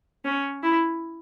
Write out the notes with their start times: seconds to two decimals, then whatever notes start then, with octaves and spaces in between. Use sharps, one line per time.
0.25 C#4
0.63 E4